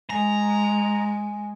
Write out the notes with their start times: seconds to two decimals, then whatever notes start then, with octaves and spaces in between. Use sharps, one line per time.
0.10 G#3 G#5 A#5